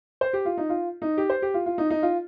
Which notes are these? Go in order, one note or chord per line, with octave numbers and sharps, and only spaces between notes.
C5
G4
F4
D#4
F4
D#4
G4
C5
G4
F4
F4
D#4
D#4
F4